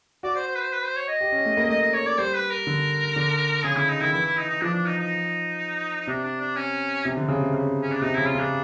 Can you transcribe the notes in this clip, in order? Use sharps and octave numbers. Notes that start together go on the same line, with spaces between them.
F#4 D5
C5
C5
B4
C5
B4
C5
C#5
D#5
G4
C#4
A3
A#3
A3 D#5
D#5
C#5
D5
G3 C5
B4
A#4
D3
D3
C#3 G#4
D3 E4
D#4
D#3 E4
E3 E4
E4
D#4
D#4
F3 D4
D4
D#4
D#4
D#4
C3 D4
D4
D4
C#4
C3
D3
C#3
C3
C#3
C#4
D4
C3 D#4
C#3 E4
F4
C#3 D4